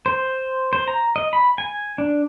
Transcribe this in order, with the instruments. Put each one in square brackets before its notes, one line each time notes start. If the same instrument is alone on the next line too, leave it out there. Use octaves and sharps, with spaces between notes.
[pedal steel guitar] C5
C5
A#5
D#5
B5
G#5
D4